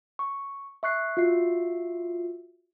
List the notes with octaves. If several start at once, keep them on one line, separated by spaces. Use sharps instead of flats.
C#6
E5 C#6 F#6 C7
F4 F#4 E5 C7